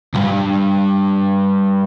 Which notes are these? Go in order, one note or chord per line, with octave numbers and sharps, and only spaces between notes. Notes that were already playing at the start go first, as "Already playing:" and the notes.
C#2 G2